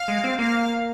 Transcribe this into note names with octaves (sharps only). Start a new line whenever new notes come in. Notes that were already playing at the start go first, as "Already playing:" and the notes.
Already playing: F5
G#3
C4
A#3 F5